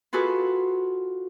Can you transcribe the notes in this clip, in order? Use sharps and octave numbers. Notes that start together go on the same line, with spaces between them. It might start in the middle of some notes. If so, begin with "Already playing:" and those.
F4 F#4 G#4 A4 B4